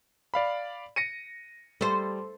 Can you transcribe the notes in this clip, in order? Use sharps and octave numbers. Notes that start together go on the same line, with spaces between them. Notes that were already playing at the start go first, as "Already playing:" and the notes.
D5 F5 B5
A#6 C#7 D#7
G3 A4 C5